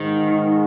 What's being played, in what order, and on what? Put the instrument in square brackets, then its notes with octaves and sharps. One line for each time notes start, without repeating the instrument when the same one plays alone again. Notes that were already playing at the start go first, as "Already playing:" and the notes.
Already playing: [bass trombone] G#2 [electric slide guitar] D#3